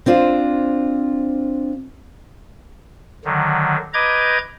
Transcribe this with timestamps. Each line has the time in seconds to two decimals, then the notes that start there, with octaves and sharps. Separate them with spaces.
0.06 C4 D4 F4 C5
3.25 D3 D#3 F#3
3.93 B4 D#5 A#5 D6 G6 G#6